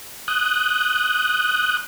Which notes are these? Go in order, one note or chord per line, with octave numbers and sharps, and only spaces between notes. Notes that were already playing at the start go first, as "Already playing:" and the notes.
D#6 F#6 G6